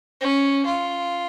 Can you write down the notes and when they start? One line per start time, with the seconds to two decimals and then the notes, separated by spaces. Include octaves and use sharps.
0.21 C#4
0.66 F4